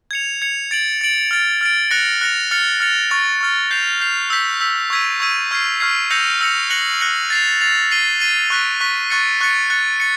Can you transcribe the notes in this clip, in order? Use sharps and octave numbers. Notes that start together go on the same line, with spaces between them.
G#6 C#7 F7
G#6 C#7 F7
A6 D7 F#7
A6 D7 F#7
F6 A6 D7
F6 A6 D7
F#6 A#6 C#7 F7
F#6 A#6 C#7 F7
F6 A6 C#7 F7
F6 A6 C#7 F7
C#6 F6 A6
C#6 F6 A6
G6 C7 F7
G6 C7 F7
E6 G6 B6
E6 G6 B6
C#6 E6 G#6 B6 D#7
C#6 E6 G#6 B6 D#7
C#6 F6 G#6 C7
C#6 F6 G#6 C7
E6 G6 A#6 C#7 F7
E6 G6 A#6 C#7 F7
F#6 A#6 C#7 F#7
F#6 A#6 C#7 F#7
A6 C7 F7
A6 C7 F7
A6 C7 D#7 G7
A6 C7 D#7 G7
C#6 F#6 B6
C#6 F#6 B6
C#6 F#6 A6 C#7
C#6 F#6 A6 C#7
F#6 A6 C#7
A6 C#7